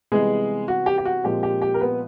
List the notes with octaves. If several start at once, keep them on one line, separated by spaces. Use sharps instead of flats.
C3 E3 G3 G#3 B3 G#4
F#4
G4
G4
F#4
A#2 F3 G#3 C4 G4
G4
G4
A#4
B3 B4